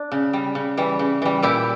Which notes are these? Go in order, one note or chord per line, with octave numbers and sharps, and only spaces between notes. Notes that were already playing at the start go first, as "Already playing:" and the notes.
Already playing: D4
C#3
G3
C#3
E3 G3
C#3
E3 G3
A#2 E4 G4